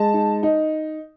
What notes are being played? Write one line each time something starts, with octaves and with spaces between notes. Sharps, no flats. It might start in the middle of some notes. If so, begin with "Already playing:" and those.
Already playing: G#3 A5
D#4
D#4